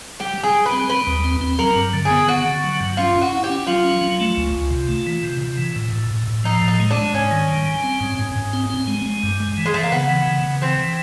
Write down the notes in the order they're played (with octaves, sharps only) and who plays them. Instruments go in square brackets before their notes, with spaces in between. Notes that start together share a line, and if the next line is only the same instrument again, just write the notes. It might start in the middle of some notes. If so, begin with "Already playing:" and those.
[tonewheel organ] G3 [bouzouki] G4
[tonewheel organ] G3
[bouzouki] G#4
[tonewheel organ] G3
[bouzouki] B4
[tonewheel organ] C4
[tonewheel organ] G3 [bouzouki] B4
[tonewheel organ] D#2
C4
C4
[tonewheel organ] F#3 [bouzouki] A#4
[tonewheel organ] G2
D3
[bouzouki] G#4
[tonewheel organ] B3
[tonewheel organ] D3 [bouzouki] F#4
[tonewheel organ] D3
F#3
G2
[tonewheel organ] C#4 [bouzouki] F4
[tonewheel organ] C#4
[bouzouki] F#4
[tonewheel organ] E4
[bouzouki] G4
[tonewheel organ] C#4
[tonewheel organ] F#3 [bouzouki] F4
[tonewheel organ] C#4
F#3
A3
C#2
C#2
C3
A3
E3
C3
C3
E3
A2
A2
A2
A2
[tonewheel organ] F3 [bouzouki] D#4
[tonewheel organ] A2
[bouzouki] D#4
[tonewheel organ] G#3
[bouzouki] D4
[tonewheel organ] G#3
[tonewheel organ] G#2 [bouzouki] C#4
[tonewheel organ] D#3
G3
G3
C4
G#2
G#2
G#2
C4
C4
G#3
G#3
G2
G#3
E3
[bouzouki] G#3
[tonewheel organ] E3 [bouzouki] A3
[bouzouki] A#3
[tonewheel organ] C#3 [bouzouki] B3
[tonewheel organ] E3
C#3
C#3
[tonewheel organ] E3 [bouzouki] C4
[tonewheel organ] E3